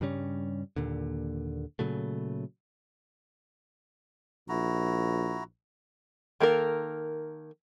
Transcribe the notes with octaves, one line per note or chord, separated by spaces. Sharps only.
G2 C#3 G3 C#4
D#2 A#2 D3
A#2 C#3 F#3 A3
A#1 E4 F#4 A#5
D#3 A#3 A4 A#4